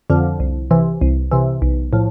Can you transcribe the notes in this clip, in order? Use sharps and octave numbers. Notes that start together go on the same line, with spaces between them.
F2 D3 F3
C2
C3 E3
C2
C3 E3
B1
A2 F3